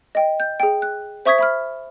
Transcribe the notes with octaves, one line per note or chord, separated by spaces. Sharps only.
D#5 G5
G6
G#4 G5
F#6
C5 E5 C#6 D#6 G#6 B6
E5 B5 F6